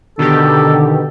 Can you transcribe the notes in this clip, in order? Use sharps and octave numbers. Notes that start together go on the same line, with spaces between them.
B2 D3 D#3 G4 A4